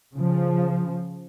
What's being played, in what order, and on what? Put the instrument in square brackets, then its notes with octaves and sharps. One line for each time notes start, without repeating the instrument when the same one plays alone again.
[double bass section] C#3 F3